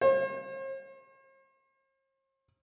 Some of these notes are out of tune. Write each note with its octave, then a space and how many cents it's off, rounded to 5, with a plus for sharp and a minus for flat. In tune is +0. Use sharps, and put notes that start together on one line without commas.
C5 +45